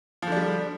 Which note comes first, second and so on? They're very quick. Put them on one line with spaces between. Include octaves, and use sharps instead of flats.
F3 D3 D4 G3